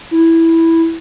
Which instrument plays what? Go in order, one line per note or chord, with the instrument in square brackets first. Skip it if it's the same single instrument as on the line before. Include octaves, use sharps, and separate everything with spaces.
[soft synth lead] E4